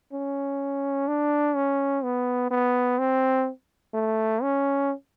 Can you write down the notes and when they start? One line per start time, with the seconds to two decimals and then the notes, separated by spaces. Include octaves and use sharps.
0.13 C#4
1.08 D4
1.55 C#4
2.04 B3
2.51 B3
2.99 C4
3.94 A3
4.42 C#4